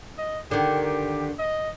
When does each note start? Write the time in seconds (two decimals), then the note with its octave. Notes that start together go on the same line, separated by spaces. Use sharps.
0.18 D#5
0.51 D3 D#3 G4
1.39 D#5